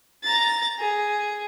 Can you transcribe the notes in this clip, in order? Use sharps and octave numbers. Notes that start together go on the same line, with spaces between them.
A#5 A6
G#4